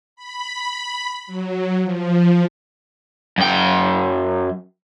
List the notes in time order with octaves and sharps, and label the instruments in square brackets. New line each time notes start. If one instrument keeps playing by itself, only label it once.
[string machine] B5
F#3
F3
[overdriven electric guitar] F#2 G5